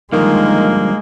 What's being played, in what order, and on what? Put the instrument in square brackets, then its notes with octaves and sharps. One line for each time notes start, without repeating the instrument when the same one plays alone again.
[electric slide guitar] G2 D3 F3 [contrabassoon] D#3 [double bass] G#3 [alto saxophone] A#3